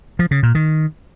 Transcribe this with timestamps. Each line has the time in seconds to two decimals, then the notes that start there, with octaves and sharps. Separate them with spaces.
0.19 F3
0.31 C#3
0.43 A#2
0.55 D#3